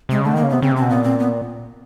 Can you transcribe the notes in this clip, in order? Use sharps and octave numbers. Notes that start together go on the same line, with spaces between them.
C3 G#3
C#3
D3 A3
D#3 A#3
C#3
C3 B3
C#3 C4
C3
C4
B2
A#2 B3
C4
B3